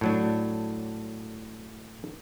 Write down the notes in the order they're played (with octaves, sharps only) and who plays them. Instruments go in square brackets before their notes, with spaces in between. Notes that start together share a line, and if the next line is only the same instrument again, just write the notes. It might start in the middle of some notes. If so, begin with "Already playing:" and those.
[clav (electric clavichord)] A2 F#3 D4